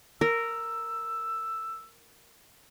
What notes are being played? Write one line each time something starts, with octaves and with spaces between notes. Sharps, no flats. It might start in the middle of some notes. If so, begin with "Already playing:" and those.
A#4 E6